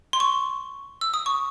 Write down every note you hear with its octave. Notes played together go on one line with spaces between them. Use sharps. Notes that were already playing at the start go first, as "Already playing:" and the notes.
C6
C#6
E6
D#6
C#6